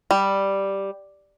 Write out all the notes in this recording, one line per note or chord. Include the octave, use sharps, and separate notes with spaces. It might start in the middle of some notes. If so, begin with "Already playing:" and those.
G3